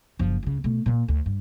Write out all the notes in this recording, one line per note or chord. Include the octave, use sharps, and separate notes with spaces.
F#1 F3
C#2 C#3
B2 A3
A#2 A#3
D2
G2